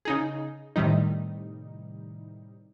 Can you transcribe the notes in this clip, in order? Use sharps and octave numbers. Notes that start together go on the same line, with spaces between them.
C#3 D#4 G#4
A2 C3 D#3 G3 D#4